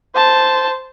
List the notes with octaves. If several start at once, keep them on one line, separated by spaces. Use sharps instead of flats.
C5 A5